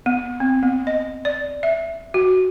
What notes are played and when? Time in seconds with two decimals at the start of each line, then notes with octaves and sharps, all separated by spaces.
0.06 B3
0.40 C4
0.63 B3
0.87 D#5
1.25 D5
1.63 E5
2.14 F#4